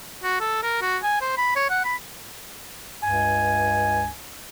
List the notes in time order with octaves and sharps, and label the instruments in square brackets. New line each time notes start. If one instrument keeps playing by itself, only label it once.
[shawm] F#4
A4
A#4
F#4
G#5
C5
B5
C#5
F#5
B5
[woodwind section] C#2 G2 G#5